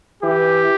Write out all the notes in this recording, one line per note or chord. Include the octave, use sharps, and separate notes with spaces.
E3 G4